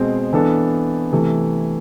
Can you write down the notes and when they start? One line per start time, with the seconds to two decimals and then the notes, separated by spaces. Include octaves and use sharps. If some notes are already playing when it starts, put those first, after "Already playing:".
Already playing: B2 G#3 C4
0.33 E3 B3 D4 A4
1.12 C3 E3 A3